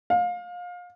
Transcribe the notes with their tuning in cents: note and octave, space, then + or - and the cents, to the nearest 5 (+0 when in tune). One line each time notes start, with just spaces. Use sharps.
F5 +25